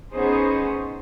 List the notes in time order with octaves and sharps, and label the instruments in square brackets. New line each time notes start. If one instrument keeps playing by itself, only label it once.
[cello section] B3 C#4 D#4 G#4 C5